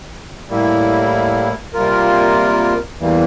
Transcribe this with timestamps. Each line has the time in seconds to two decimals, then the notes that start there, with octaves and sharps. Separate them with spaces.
0.49 A2 G3 A#3 E4
1.74 C3 G3 A#3 F4 A#4
2.99 E2 E3 G3 A#3